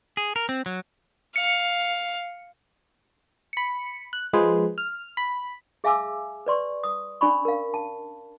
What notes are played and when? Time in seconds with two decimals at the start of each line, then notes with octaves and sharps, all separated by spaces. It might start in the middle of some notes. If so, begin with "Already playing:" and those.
0.17 G#4
0.36 A#4
0.49 C4
0.66 F#3
1.36 F5 C#7
3.53 B5 C#7
4.13 F#6
4.33 F3 G#3 G#4 B4 C5
4.78 F6
5.17 B5
5.84 G#4 E5 F5 G#5 D6 E6
6.47 B4 D5 C6 C#6
6.84 D#6
7.21 C#4 D4 D5 B5 C#6
7.45 A#4 F5
7.74 A5